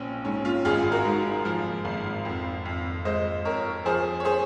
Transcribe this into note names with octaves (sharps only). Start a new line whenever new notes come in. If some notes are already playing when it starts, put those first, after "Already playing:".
Already playing: A#1 C4 C#4
G#2 C#4
C#4 F4
G#1 F4 G#4
F#4 A#4
G#2
F3
G#1
F2
F2
G#3 C5 D#5
F2 A#4 C#5
F3 G#4 C5
C#5
G#4 C5